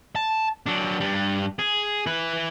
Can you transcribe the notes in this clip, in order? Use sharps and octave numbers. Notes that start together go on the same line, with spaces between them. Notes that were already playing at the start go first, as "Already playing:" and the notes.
A5
F#3 D4
G2 G3
G#4
E4 B4